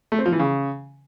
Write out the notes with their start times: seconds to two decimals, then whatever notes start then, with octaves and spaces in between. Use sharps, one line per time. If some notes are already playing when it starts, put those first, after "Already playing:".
0.12 A3
0.19 C4
0.26 F3
0.32 E3
0.39 C#3